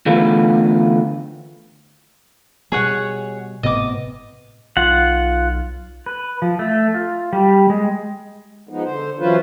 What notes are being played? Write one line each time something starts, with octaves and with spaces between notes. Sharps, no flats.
D3 E3 A3 B3 F4 B4
B2 G3 G#4 C#5 F#5
G#1 A2 C3 B3 D#5 D6
B1 F4 F#5
B4
F3
A3
F4
G3
G#3
F3 G#3 B3 D#4
D3 C5
E3 F#3 C#4 F4 B4 C5